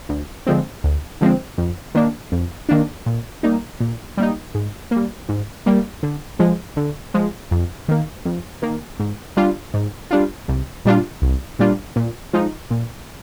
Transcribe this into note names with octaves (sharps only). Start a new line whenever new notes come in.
D2
D3 F3 G#3 C4
D2
D3 F3 G#3 C4
F2
D#3 A#3 D4
F2
D#3 A#3 D4
A#2
G3 A#3 D#4
A#2
G3 A#3 D#4
G#2
G3 A#3
G#2
G3 A#3
D3
F3 G#3
D3
F3 G#3
F2
D#3 A#3
F2
D#3 A#3
G#2
G3 D4 F4
G#2
G3 D4 F4
C2
A#2 G3 D4 F4
C2
A#2 G3 D4 F4
A#2
F3 G#3 D#4
A#2